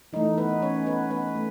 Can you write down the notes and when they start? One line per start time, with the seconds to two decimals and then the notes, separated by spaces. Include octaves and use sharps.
0.13 E3 A3 D#4
0.38 B3 B4
0.62 C#4 C#5
0.86 B3 B4
1.11 B3 B4
1.35 A3